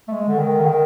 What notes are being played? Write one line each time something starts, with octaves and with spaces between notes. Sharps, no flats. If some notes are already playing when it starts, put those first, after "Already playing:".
A3
G#3
D3
D#3
D3
D#3